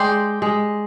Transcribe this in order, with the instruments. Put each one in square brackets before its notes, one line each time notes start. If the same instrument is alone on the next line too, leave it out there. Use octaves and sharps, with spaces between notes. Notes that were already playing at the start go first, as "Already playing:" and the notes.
Already playing: [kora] G#3 [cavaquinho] D5 G5 C6
[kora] G#3